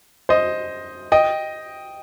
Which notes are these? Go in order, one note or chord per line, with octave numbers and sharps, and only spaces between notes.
C5 D#5
D#5 G5